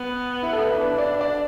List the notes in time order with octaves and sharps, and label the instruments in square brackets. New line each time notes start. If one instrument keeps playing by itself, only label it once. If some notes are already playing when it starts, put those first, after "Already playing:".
Already playing: [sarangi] B3
[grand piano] E4
A4
B4
[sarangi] D4 [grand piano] B4
[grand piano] D5
D5